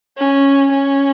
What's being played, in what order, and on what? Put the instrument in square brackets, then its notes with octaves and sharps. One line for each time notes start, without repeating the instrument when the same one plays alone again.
[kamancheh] C#4
C#4